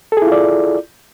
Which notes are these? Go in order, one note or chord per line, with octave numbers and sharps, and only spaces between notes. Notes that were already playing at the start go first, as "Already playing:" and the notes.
E4 F4 G#4 A4 D5